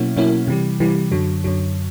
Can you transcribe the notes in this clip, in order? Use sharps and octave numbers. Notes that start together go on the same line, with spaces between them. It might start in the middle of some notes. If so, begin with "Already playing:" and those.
Already playing: B2 F#3 A#3 C#4 E4
B2 F#3 A#3 C#4 E4
C3 E3 G3
C3 E3 G3
F#2 D3 F#3
F#2 D3 F#3